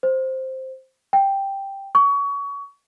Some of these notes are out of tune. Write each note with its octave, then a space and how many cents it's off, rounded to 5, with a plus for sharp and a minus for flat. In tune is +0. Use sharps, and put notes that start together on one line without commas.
C5 +5
G5 +0
C#6 +30